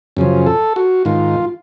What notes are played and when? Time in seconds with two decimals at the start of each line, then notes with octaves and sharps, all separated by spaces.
0.17 F#2 C#3 F3
0.47 A4
0.76 F#4
1.05 G#2 D#3 F4